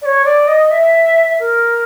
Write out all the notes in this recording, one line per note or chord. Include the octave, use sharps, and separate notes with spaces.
D5
C#5
D5
D#5
E5
A#4